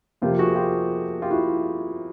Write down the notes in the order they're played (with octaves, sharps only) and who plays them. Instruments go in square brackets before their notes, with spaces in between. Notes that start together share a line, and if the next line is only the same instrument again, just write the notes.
[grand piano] F2 C3 F3 A#3 F4 G4
F#4 G#4
F4 G4
F4 G4
E4 F#4